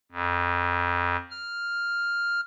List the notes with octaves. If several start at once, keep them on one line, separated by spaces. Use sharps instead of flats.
F2
F6